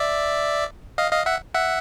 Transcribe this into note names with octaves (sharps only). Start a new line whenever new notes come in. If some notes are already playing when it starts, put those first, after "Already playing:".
Already playing: D5 E5
D#5 F5
D#5 F5
E5 F#5
E5 F#5